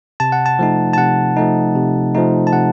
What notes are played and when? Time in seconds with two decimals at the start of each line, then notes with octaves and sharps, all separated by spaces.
0.20 C3 A5
0.32 F#5
0.46 A5
0.59 F3 A3 D#4
0.93 A5
0.98 C3 F#5
1.37 F3 A3 D#4
1.75 C3
2.15 F3 A3 D#4
2.47 A5
2.53 C3 F#5